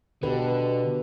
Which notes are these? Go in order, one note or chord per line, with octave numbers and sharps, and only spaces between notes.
B2 D3 G4 A4 B4